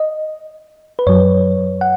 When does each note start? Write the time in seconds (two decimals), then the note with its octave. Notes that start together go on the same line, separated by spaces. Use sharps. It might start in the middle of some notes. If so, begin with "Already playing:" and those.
Already playing: D#5
0.99 B4
1.07 F#2 F#3 C#5
1.81 F#5